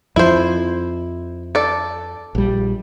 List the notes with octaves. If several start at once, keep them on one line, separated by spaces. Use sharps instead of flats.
F2 F3 E4 C5
A4 D5
A#1 G3